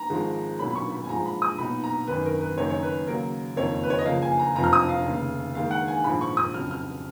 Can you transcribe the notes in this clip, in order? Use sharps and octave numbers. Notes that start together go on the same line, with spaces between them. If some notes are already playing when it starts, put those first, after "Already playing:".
Already playing: A#5
G#1 G#2 F3 G#3
B1 A#2 F#3 A#3 C#4 B5
B5
C#6
B5
G#5
G#2 F3 G#3 A#5
B5
D#6
B1 A#2 F#3 B3 D#4 B5
A#5
G#1 F#2 D#3 B4
A#4
B4
F#1 F#2 D#3 A#3 D#4 C#5
C#5
B4
D#2 C#3 F#3 A#3 A#4
F#1 F2 D#3 A#3 C#5
B4
C#5
D#5
C#2 C#3 F3 A#3 F5
G#5
A#5
F1 F2 F3 A#5
F6
D#6
F5
F1 D#2 C#3
D#2 D#3 G#3 F5
F#5
G#5
A#1 G#2 F3 B5
C#6
D#6
F2 C#3 F#3 F6
F6